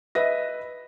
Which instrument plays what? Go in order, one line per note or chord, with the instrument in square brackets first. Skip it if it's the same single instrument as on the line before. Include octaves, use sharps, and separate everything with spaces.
[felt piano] B4 D#5 E5 A#6